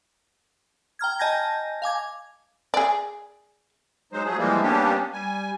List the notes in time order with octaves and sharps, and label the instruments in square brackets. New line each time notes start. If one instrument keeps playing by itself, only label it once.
[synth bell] G5 A#5 F6 G#6
D#5 G#5 A5 G6 G#6 A#6
F5 G#5 D6 G#6
[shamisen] G#4 D5
[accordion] F#3 G#3 D#4 C5
F3 F#3 A3 G#4
E3 F3 G3 G#3 A#3
G3 A#3 B3 C#4 D4 G4
G3 G#5